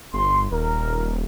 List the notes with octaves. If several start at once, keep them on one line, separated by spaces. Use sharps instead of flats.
G1 C6
D#1 A#4